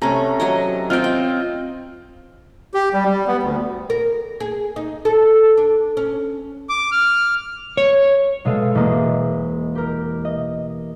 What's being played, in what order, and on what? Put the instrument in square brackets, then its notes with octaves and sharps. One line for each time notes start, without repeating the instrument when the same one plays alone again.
[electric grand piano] C3 A#5 [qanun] A3 C#4
[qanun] F#3 C#5 D#5
[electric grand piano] C4 D#5 F6 [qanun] F4 G5
[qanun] G5
[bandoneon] G4
G3
G3
B3
D2
[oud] A#4
G#4
D#4
A4
D4
C#4
[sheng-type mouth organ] D6
F6
[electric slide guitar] C#5
[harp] B2 G#3 A4 F5 D#7
E1 A#3 E4 G#4 D#5
G4 A#4
D#5